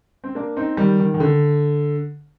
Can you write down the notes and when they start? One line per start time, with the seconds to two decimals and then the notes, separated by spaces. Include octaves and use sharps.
0.24 C4
0.35 A#3 D4
0.57 C4 D#4
0.77 D#3 G3
1.00 D#3
1.14 D#3
1.20 D3